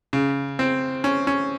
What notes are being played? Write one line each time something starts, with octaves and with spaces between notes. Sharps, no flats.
C#3
C4
C#4
C#4